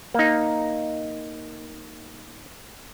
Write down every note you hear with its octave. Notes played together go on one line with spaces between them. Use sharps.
A#3 D#4